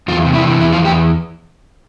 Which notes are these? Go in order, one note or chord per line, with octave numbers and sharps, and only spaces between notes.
E2 F4
C3
E4
E3
E2 E4
F4
E2
G4